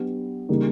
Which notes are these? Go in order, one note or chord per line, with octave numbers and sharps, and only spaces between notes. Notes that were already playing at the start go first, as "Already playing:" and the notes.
Already playing: F#3 B3 D4 G4
C#3 E3 G3 A#3 D#4